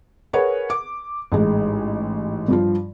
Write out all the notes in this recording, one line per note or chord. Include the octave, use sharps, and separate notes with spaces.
G#4 A#4 B4 C#5 F#5
D6
A1 G#2 G#3
G2 F3 F4